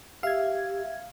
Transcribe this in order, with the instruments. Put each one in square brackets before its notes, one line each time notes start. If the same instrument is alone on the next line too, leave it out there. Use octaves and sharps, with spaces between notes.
[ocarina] G4 [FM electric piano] E5 G#6 [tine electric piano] F5